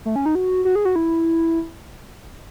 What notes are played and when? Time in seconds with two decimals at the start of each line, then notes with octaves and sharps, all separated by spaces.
0.05 A3
0.16 C#4
0.26 D#4
0.35 F#4
0.65 F#4
0.75 G#4
0.85 F#4
0.96 E4